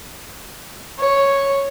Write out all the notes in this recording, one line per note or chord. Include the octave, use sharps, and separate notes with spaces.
C#5